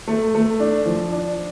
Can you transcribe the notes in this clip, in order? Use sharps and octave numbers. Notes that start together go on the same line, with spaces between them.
A3
A3
D4
F3
D4